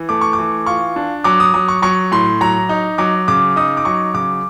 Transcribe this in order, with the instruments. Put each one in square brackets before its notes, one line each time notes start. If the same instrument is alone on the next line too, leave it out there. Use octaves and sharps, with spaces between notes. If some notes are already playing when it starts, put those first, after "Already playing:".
Already playing: [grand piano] E3
A3 D6
C#6
D6
E3
F4 C#6
D4
F#3 D6
D#6
F#3 D#6
C#6
F#3 C#6
A2 C6
F#3 A#5
D#4
F#3 D6
C#3 D6
D#4 D#6
D6
F#3 C#6
C#3 D6